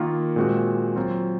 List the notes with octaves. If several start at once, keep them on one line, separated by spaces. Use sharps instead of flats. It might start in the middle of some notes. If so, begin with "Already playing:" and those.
Already playing: D#3 A#3 F4
A#2 G#3 C4 F#4
F#3 C4 F4